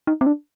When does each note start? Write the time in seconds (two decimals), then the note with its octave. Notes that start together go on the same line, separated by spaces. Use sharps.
0.07 D#4
0.21 C4
0.26 D4